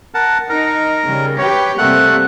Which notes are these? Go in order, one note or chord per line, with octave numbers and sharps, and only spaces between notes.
A#4 F#5 A5
D#4 A#4
C#3 G3
G4 B4 C#5
C3 G3 A3 A#3 F#5 F#6